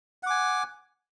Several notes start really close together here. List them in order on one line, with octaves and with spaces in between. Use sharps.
F#5 D6 G#5